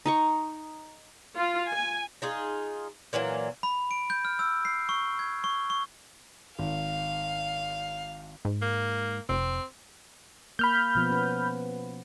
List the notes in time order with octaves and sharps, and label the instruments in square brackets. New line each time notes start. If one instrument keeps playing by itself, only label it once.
[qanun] D#4 A#5 C#6
[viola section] F4
G#5
[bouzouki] D#4 F4 G#4
A#2 E3 F#3 A#3
[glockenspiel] B5
D7
G6
F6
E6
C7
C#6
G#6
C#6
C#6
[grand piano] G#1 [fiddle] F5
[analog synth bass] G#2
[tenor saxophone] A#3
[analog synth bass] F1 [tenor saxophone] C4
[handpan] A#3 [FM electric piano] B5 F6 G6
[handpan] B2 F3 B3
C#4 B4